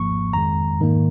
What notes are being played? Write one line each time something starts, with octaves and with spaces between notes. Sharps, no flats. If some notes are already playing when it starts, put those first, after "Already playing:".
Already playing: G#1 G#2 F3 A#3 C#6
F2 D#3 G#3 A#5
G#2 D#3 A#3